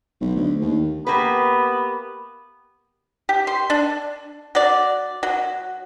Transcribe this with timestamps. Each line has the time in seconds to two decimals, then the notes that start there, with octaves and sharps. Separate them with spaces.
0.21 B1
0.36 D2
0.62 D#2
1.07 A#3 B3 G4 B4
3.29 G4
3.47 C6
3.70 D4
4.55 F#3 D5
5.23 F#3